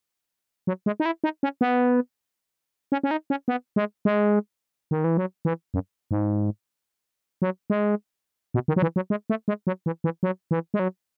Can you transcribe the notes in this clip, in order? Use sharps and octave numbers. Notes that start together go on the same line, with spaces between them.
F#3
G#3
D#4
E4
D#4
C#4
B3
C#4
C#4
D#4
C#4
B3
G#3
G#3
D#3
E3
F#3
E3
F#2
G#2
F#3
G#3
B2
D#3
F#3
E3
F#3
G#3
A3
G#3
F#3
E3
E3
F#3
E3
G#3
F#3